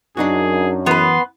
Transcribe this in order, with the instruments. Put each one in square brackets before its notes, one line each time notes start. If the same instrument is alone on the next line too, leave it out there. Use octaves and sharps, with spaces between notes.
[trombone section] F#2 [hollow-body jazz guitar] D4 D#4 F#4 [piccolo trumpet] G#4
[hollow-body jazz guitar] E3 [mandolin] B3 B4 [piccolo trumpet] C6